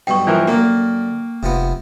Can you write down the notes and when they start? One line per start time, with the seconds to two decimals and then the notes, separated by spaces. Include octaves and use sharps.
0.07 B1 G2 B2 G5 C#6
0.27 E3 F3 A#4
0.48 F#2 D3 A#3
1.43 F1 C3 F3 B3